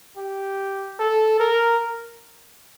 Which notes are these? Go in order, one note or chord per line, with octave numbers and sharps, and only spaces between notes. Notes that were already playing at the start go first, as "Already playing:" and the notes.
G4
A4
A#4